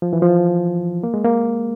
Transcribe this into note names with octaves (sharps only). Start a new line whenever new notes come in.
F3
E3
F3
A#3
G#3
A#3